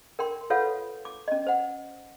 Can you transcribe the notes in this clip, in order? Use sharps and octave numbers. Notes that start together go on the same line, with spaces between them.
A#4 G5 C6
F4 A4 B4 C#5 F5 F#5
D6
C#4 D#5
C5 F#5